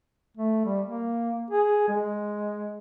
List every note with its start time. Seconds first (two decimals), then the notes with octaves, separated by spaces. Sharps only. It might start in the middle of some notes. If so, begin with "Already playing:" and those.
0.37 A3
0.65 G3
0.86 A#3
1.51 G#4
1.88 G#3